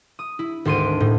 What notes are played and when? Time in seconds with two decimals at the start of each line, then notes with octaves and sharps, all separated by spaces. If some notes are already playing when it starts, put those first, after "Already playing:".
0.19 D#6
0.39 E4
0.65 G#1 D2 A4 C6 D7 D#7
1.00 A2